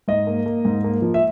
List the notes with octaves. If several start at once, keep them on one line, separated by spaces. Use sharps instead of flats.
G#2 D#5
A#3
A#3
G#2
A#3
F3
E5